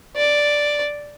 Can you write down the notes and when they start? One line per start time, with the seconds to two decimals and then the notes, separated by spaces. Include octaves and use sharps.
0.17 D5